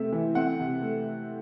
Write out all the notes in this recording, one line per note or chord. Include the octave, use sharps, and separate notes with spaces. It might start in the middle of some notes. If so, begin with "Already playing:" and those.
Already playing: C3 A3 C4 E5
E3
C4 F#5
C3
A3